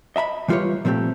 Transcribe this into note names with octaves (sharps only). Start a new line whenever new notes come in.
D#5 E5 A#5 B5
E3 G3 F4 G4 B4 C#5
A#2 F3 A3 C4 G4